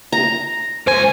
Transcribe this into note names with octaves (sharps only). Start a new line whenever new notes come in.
A#5
C#2 C5 G#5